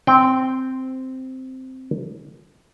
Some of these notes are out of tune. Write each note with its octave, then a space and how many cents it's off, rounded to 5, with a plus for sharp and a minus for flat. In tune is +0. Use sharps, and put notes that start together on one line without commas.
C4 -5 G5 +0